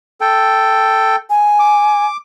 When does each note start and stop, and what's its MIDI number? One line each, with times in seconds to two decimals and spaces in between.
0.21 1.16 69
0.21 1.16 79
1.30 2.06 80
1.60 2.17 86